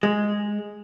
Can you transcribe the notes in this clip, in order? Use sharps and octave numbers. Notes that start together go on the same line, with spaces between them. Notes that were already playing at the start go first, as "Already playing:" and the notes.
G#3